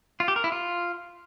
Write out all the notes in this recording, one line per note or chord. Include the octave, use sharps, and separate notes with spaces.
F4
G4
A#4
E4
F4